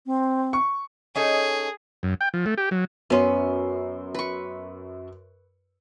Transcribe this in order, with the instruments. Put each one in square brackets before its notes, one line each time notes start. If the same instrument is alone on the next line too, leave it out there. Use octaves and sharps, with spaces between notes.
[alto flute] C4
[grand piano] C#6
[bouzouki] C#4 D#4 A4 [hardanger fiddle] G#4
[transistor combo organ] F#2
G5
F3
A3
G4
F#3
[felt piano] F#2 C6 [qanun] B3 C#4
[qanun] B4 C#6